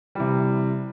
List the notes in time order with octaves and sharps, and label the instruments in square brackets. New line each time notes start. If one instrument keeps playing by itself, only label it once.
[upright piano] C3 E3 G3